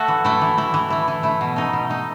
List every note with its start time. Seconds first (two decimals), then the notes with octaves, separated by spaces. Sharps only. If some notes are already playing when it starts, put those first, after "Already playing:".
Already playing: A3 F#4 A4
0.08 E3
0.25 A3 E4
0.41 E3
0.58 A3 E4
0.74 E3
0.90 A3 E4
1.08 E3
1.23 A3 E4
1.41 B2
1.56 A3 D#4
1.73 B2
1.89 A3 D#4